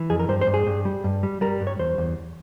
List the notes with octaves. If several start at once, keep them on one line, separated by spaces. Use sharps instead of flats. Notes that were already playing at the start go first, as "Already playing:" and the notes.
Already playing: E3
F2 G#4
A#4
G2 C5
C5
G2
G#4
G2
G3
G2
G3
G3 A#4
G2
C#5
E2 C5
E2